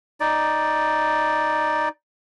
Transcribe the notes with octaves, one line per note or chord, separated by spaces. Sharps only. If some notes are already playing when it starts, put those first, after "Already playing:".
D#4 D5